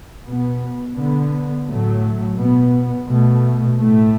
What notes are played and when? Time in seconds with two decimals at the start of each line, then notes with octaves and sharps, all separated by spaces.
0.24 B2 B3
0.94 D3 B3
1.65 A2 F#3 A3
2.36 B2 B3
3.07 B2 A3
3.78 A2 A3